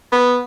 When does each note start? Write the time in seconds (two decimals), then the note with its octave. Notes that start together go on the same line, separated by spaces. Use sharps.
0.12 B3